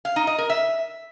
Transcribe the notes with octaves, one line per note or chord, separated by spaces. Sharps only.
F5
D#4
D#5
A#4
E5